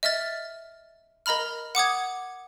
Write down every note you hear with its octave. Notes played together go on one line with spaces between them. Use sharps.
D#5 E5 F6 A6
A#4 D#5 A#5 B5 F6
F#5 D6 D#6 G#6